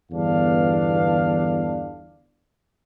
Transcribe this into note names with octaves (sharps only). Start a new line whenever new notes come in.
G1 E2 D4 F5